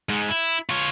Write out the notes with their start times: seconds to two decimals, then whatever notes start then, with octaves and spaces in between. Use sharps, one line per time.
0.09 G#2 G#3
0.29 E4
0.69 F4 C#5